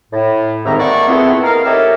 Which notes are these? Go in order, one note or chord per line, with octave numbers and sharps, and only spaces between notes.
A2
D#2 G#2 D#3 C4 E5 A#5
A3 A#3 D5 F#5 C#6
A3 B3 C4 E4 F4 G#4
A#4 D#5 F5
D#4 G4 A4 A#4 C#5 E5